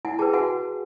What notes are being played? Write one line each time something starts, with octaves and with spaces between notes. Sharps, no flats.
E4 F#5 G#5
G#4 B4 G5 A5
F#4 F#5 G#5